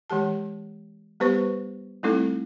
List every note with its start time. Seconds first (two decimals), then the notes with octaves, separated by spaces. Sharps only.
0.10 E3 G#3 G4 A5
1.20 G3 B3 G4 B4 C5 C#6
2.03 G3 A3 C4 D#4 E4 A4